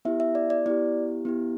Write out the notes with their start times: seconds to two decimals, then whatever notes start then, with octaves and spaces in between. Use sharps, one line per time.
0.05 B3 E4 G4 E5
0.20 E5
0.35 D5
0.50 D5
0.66 B3 E4 G4 D5
1.25 B3 E4 G4